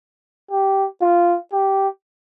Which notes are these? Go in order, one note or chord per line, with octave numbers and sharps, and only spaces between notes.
G4
F4
G4